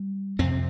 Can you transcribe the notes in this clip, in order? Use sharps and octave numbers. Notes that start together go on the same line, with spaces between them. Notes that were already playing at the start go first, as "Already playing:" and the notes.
Already playing: G3
F2 C3 C4